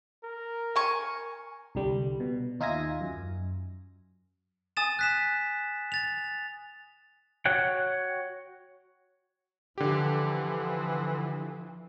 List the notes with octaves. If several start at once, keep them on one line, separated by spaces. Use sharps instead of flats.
A#4
G#5 C#6
C2 D3 G3
B2
D#2 D#4 F4 E5 G#5 A#6
F#2
G#5 D#6 A6 E7
F#6 B6 E7
A6 F7
F#4 C#5 F#5 G5
D3 E3 F3 G4